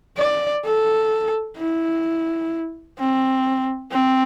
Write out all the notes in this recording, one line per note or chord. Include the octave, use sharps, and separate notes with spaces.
D5
A4
E4
C4
C4